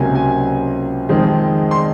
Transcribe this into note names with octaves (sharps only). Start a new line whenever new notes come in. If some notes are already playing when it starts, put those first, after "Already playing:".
Already playing: C#2 C3 F#3 A#3 C#4 G#5
G#5
F2 D#3 G#3 C4
C6